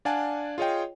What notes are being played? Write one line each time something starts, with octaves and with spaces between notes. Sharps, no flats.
D4 D5 F5 F#5 G#5 A5
F4 G#4 C#5 D#5 G5